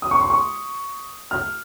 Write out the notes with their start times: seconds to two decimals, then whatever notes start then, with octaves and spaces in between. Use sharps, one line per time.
0.02 D#6
0.11 C#6
0.21 C6
0.30 C#6
1.31 F6